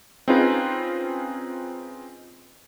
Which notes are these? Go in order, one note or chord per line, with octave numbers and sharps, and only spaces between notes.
C4 C#4 D#4 F4 G#4 B4